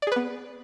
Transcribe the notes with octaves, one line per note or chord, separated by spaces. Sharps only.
B3 G#4 B4 D5